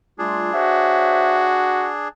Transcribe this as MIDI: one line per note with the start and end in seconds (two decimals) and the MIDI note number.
0.19 0.50 55
0.19 0.50 57
0.19 2.08 62
0.19 0.50 65
0.19 2.08 68
0.54 1.91 66
0.54 1.52 72
0.54 1.52 73
0.54 1.52 76